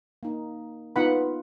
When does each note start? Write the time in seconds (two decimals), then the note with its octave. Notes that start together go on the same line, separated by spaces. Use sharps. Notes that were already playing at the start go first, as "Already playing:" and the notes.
0.23 A#3 D#4
0.96 B3 D#4 F4 B4 F#5 B5